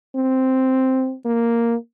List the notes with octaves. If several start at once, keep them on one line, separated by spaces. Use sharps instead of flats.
C4
A#3